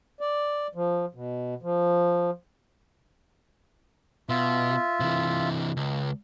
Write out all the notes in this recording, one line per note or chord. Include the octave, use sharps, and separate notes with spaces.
D5
F3
B2
F3
B2 F4 E5
C3 E3
C#2